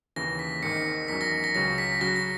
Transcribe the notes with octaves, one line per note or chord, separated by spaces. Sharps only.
D#2 C#3 E3 A#6
B6
G#1 G#2 D#3 C#7
E2 D#3 F#3 C#4 B6
A#6
B6
A#6
C#2 C#3 F#3 C#4 A#6
B6
C#3 F#3 C#4 F#4 A#6
A#6